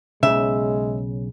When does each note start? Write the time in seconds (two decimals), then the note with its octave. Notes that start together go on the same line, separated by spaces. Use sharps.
0.23 B1 C#3 G#3 E5